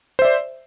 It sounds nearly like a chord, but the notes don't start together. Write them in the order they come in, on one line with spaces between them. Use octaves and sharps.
C5 E5 D5